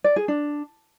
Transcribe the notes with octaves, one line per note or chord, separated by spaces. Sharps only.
D5
G#4
D4